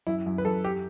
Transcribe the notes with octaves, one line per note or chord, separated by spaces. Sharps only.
F#2 E4
F#2
B4
F#2 A4
G4